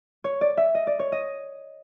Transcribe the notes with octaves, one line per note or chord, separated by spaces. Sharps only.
C#5
D5
E5
D#5
D5
C#5
D#5